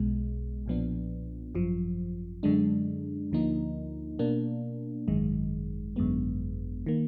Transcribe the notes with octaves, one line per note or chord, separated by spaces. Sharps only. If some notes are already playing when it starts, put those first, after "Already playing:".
Already playing: B1 B2 G#3
B1 A#2 F3 B3 D4
G#1 F#2 F3
F#2 D3 G#3 D4
D2 D3 F3 A#3 D#4
B2 A#3 D4
G#1 F#2 D#3 G#3
G#1 F#2 D3 G#3 B3
D#3 A#3